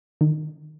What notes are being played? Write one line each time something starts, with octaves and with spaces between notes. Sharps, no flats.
D#3